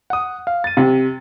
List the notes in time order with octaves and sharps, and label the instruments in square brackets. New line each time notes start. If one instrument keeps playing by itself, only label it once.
[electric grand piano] F#5 D#6
F5
A6 D#7
[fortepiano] C3